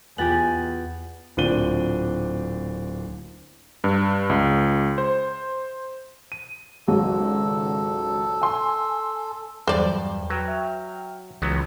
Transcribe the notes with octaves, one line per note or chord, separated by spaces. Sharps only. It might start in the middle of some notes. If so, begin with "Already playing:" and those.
E2 B3 F4 G4 G#5 A6 F#7
D1 A#2 C4 D4 D#7 G7
G2
C#2
C5
D#7
G#1 C#2 F#3 A4
G#5 C6
E2 G2 F#3 G3 C5 D5
F#3 B4 G5 F6
E5 G5 F6
C#2 E3 F#3 B3